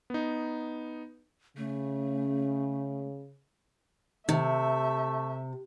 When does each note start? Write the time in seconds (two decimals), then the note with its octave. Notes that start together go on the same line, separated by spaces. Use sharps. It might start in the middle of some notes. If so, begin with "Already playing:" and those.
0.10 B3 D#4
1.57 C#3 A3
4.29 C3 D#3 A3 E5